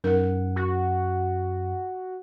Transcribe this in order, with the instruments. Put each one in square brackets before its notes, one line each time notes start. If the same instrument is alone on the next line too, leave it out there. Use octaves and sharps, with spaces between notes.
[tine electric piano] F#2 F#5 [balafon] D#4 A#4
[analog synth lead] F#4